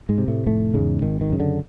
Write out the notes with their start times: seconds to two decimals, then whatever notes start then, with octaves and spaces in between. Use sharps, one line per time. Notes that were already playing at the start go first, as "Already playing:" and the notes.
0.09 G#2 G#3
0.18 C3
0.28 A2 A3
0.46 F1 A2 A3
0.74 E2 G#2 C#3 G#3
1.02 G#1 D#3
1.21 D#3
1.30 F#2 C#3
1.40 D3